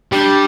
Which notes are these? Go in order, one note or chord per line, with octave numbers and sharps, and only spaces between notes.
G3 D4